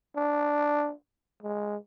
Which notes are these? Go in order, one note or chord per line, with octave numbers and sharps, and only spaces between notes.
D4
G#3